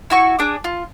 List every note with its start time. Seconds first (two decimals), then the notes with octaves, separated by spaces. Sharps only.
0.10 E4 F#4 C#6
0.39 D4 G#4 D6
0.64 F4